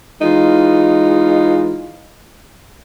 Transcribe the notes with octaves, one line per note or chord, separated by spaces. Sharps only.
E3 G#3 D#4 F4